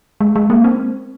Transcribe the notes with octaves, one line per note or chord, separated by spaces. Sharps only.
G#3
G#3
A#3
C4